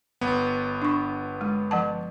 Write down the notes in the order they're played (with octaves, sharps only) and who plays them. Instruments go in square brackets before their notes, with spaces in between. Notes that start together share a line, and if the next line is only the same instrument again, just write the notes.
[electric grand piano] G1 B3
[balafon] D4 C#6
G#3
F3 F#5 A5